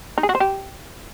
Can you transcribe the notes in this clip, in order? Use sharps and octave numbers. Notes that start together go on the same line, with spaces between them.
D#4
G#4
F#4
C5
G4